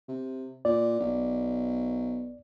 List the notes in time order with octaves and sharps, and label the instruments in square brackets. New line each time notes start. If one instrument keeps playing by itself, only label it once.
[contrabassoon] C3
[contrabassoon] A#2 [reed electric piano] D5
[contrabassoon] B1